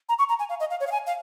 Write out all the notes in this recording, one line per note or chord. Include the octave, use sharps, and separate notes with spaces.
A#5
C#6
A#5
G#5
F5
D#5
F5
C#5
F5
G#5
F5